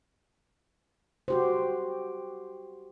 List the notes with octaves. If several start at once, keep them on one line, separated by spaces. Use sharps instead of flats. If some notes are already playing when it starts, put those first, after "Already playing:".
F#4 G4 C5